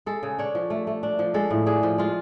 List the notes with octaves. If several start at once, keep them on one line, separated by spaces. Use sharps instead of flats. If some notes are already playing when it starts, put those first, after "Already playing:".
G#3 A4
C#3
D4 C#5
F3
A3
A3
D4
F3
G#3 A4
A2
D4 G#4
F3
G#3 F4